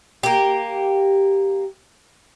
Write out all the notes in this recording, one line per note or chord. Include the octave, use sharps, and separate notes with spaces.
A#3 G4